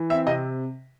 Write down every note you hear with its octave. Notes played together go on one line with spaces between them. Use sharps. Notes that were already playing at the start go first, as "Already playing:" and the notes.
Already playing: E3
C4 E5
C3 D#5